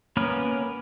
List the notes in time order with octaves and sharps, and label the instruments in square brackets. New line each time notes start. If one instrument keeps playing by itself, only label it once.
[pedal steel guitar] A#3 B3 C#4 A#4 B4